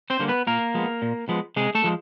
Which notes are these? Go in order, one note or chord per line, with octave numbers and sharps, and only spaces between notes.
C4 C5
D3 G3 A#3 C#4
B3 B4
A#2 A#3 A#4
F3 G#3 B3
A#2
F3 G#3 B3
C3 G#3 G#4
A3 A4
F3 G#3